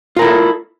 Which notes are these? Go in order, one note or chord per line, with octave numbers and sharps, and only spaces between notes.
E4 F4 A4 A#4